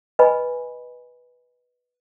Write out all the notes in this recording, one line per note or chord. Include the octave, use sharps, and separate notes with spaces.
B4 D#5 G#5 B5